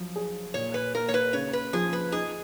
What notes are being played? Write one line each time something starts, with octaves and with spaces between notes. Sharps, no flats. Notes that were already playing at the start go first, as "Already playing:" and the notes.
Already playing: F3 F#3
G#4
A#2 C#5
B4
A#3 A#4
C#5
B4
C#3 C#5
B4
F3 G#4
B4
D#4 G#4